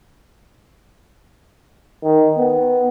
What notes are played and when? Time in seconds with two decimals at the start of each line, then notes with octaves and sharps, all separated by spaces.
2.03 D#3
2.38 B3